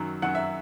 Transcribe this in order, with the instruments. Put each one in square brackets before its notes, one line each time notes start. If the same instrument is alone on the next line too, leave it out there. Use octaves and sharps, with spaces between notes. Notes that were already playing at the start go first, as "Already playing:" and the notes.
Already playing: [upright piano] F#2 D#3 F#3
F#2 D#3 F#3 F#5
E5